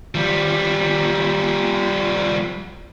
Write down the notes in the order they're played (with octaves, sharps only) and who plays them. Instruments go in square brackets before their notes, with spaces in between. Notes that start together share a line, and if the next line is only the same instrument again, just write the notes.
[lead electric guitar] F3 G3